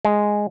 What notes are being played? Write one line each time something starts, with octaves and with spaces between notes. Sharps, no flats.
G#3